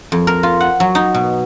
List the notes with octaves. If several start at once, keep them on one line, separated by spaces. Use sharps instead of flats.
F2
A#4
F4
F#5
F#3
D#4
B2